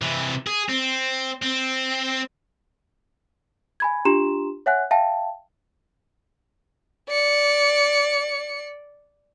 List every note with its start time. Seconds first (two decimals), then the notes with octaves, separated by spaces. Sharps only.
0.02 C3 E3
0.47 G#4
0.69 C4
1.42 C4
3.80 G#5 B5 G#6
4.05 D4 F4 G4 A#5 C6 E7
4.66 C#5 E5 F#5 G#5 F#6
4.91 E5 F5 G5 A5
7.09 D5 C#7